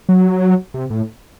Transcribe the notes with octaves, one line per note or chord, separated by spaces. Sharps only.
F#3
C3
A2